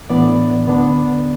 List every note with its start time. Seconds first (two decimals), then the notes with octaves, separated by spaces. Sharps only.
0.10 A2 E3 B3 D4 D5
0.66 D2 D3 B3 D4